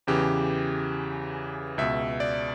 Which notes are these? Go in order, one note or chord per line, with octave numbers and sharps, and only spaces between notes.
E2 C#3 E3 G4
C#2 B2 E5
D5